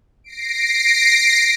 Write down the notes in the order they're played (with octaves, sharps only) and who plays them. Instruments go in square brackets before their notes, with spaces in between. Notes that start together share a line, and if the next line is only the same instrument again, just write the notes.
[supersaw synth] A#6 C7 D7